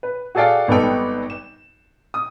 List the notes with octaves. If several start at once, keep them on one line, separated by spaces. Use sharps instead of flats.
B4
F#4 G#4 A4 D5 F5 G5
G#1 G3 B3 D#4 A4 G5
E7
D#6